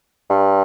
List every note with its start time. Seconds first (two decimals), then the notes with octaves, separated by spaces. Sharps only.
0.30 G2